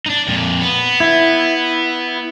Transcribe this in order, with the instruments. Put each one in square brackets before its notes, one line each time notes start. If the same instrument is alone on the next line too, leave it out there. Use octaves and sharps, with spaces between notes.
[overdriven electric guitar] D4 D#4
F2 A#2
B3
[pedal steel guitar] E4